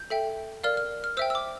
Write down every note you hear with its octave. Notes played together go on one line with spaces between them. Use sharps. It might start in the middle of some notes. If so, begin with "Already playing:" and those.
Already playing: G6
A4 E5 G5
A#4 D5 F5 F6
F6
F6
C5 E5 G5 E6
E6
D6